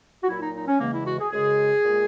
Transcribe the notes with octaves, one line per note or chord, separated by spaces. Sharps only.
F#4
A#2 F#3 E4
D#4
D#4
C#4
E2 C#3 E3 G#3 A#3
E4
F#4
G#4
F#2 C#3 G#3 G#4
A#2 G#3